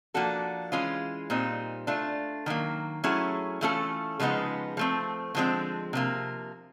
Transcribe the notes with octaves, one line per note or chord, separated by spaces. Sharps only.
F3 A#3 D4 F#4 A4
E3 G#3 C#4 F4
A#2 G3 C4 D#4
A3 D4 F4
D#3 F#3 A#3
F#3 A3 C#4 E4 G#4
E3 A3 C#4 F4 A4
C#3 F3 G#3 B3 D#4
F3 A3 C4
D3 F3 G#3 C4
C3 F3 A#3